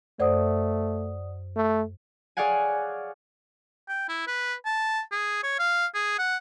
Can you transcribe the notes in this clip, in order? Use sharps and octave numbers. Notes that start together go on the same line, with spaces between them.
F#2 A3 C5 D5 F#5 D#6
A3
G#4 C#5 D5 F5 F#5 G#5
G5
E4
B4
A5
G#4
C#5
F5
G#4
F#5